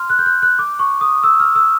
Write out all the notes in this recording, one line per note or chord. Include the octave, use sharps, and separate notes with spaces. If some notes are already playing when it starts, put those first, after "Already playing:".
Already playing: C6 F6
F#6
G6
F#6
F#6
D6
C#6
D#6
E6
F6
E6